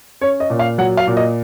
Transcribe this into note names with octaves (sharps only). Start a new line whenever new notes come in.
C#4 C#5
D#5
A#2
F5
F#3 F#5
F5
A#2
D#5